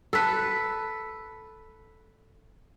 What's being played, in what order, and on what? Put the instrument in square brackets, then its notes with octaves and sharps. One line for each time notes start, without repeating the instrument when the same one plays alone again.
[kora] A4 B4